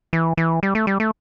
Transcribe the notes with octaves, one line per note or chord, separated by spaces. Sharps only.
E3
E3
G3
A3
G3
A3